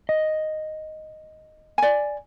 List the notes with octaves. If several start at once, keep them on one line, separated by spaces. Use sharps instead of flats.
D#5
D5 G#5